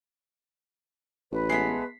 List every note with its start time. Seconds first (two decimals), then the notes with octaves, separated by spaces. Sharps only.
1.32 A1 B4
1.50 G#3 A3 B3 B6 C7